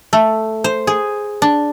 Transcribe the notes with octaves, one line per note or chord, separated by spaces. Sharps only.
A3
C5
G#4
D4